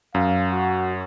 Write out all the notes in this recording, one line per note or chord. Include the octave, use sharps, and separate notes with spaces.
F#2 F5
F#4